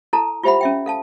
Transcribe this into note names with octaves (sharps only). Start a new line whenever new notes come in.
E4 A4 A5 A#5
F4 G4 C5 E5 F#5 B5
C#4 E5 G5
A4 F5 A5